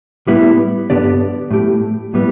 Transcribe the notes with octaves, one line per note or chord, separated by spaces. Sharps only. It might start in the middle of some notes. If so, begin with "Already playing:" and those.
A2 G3 B3 E4
G2 D3 B3 G4 D5
A2 A3 G4
A2 G3 B3